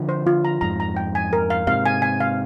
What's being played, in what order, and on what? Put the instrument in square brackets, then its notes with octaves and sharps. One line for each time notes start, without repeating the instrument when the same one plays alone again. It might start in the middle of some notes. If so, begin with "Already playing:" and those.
Already playing: [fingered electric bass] D3 F3
[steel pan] C5
F4
A#5
[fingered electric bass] F2 G#2 [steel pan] A#5
[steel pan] A#5
G5
G#5
A#4
F5
[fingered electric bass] G#2 C3 [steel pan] F5
[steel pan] G#5
G#5
F5